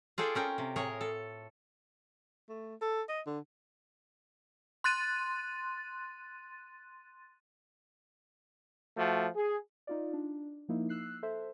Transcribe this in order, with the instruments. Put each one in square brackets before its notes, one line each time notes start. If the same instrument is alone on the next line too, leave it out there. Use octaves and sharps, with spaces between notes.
[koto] F4 G#4 A4 D5 G5
C#4 A#4 G5
C3
A2 G#4 A#4 C#5
A4
[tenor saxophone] A3
A4
D#5
D3
[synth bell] C6 F#6 A6 D#7
[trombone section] F3 A3 F#4
G#4
[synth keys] D#4 F4 D5
D4
F3 A#3 D#4 E4
E6 F#6 C7
A4 C5 E5